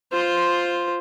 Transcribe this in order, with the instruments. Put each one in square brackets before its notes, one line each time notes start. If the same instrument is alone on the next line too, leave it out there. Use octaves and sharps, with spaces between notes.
[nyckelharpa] F4 C5